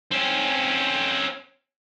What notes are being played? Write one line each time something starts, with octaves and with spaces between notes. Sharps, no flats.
C4 C#4